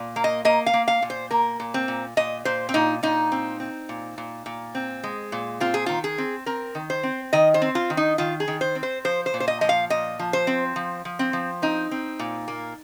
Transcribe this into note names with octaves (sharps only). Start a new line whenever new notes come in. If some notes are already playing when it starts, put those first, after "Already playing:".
Already playing: A#2
A#3
D#5
A#3 D#5
F5
A#3
F5
A#2
C5
A#3 A#4
A#2
C4
A#2
A#2 D#5
A#2 C5
C4
A#2 D#4
A#2 D#4
C4
C4
A#2
A#2
A#2
C4
G#3
A#2
C4 F4
G#4
D#3 F4
G#4
C4
C4 A#4
D#3
C5
C4
D#3 D#5
C5
C4
F4
D#3
D#4
D#3 F4
G#4
D#3
C5
C4
C5
F3 C5
C5
A#2
C5
D#5
F3 D#5
F5
A#2 D#5
F3
C5
C4
F3
F3
C4
F3
C4 D#4
C4
A#2
A#3